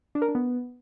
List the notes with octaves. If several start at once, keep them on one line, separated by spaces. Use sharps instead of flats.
D4
A#4
D4
B3